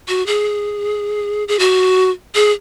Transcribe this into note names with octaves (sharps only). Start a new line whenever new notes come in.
F#4
G#4
G#4
F#4
G#4